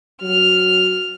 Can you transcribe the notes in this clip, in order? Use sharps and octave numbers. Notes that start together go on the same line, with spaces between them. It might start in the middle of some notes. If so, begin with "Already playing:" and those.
F#3 F6